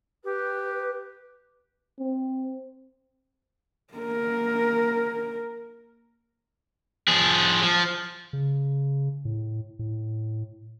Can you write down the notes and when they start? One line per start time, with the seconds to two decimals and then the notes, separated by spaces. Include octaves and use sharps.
0.25 G4 B4
1.99 C4
3.94 A#3 A#4
7.08 F3 G#4
7.63 F3
8.33 C#3
9.25 A2
9.79 A2